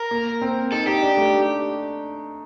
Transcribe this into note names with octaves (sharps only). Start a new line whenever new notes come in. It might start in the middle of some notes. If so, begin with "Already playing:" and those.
Already playing: A#4
A#3
C4
D#4 A4
D#4 G4
D4
A3